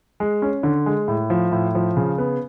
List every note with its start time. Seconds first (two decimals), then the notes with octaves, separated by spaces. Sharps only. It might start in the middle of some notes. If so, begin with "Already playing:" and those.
0.20 G#3
0.42 C#4
0.63 D3
0.86 G#3
1.08 A2
1.30 F3
1.52 A2
1.75 F3
1.97 C#3
2.18 B3